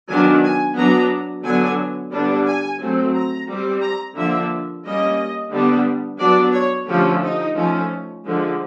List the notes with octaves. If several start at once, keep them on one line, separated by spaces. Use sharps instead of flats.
D#3 F#3 B3 D4 G#5
G#5
F#3 B3 D4 A#5
D3 F#3 B3 D4 G#5
D3 G3 B3 D4
G#5
F#3 A3 C4
A#5
G3 C4
A#5
D3 F3 A#3 D4 E5
G3 A#3 C#4 D#5
D3 G3 B3 D4
F#3 B3 D4 D5
C#5
D3 F3 A3 C#4 G4
D#4
F3 A3 C#4
D3 F3 G#3